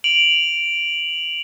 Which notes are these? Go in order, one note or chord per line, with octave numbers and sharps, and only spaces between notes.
D7 F7 F#7